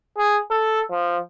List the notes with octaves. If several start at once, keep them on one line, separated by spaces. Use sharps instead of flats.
G#4
A4
F3